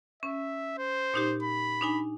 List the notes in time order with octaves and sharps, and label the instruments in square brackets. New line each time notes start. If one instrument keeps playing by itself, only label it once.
[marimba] C#4 [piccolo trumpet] E5
[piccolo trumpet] C5
[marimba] A#2 D#4 G4
[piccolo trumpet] B5
[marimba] D4 D#4 G#5